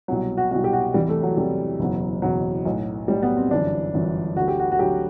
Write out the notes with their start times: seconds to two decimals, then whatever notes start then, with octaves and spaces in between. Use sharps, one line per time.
0.08 C2 B2 F#3
0.37 F#4
0.51 C2 B2 F#3 F#4
0.64 G4
0.73 F#4
0.94 E2 C3 E3 G3
1.09 A3
1.23 F#3
1.37 E2 C3 E3 G3
1.80 F#1 E2 B2 F#3
2.22 F#1 E2 B2 F#3
2.65 B1 A2 F#3
3.08 B1 A2 F#3 G3
3.22 B3
3.37 C4
3.51 G1 F#2 E3 D4
3.94 G1 F#2 E3
4.37 D2 D3 F#3 F#4
4.48 G4
4.59 F#4
4.72 F#4
4.79 D2 D3 F#3 G4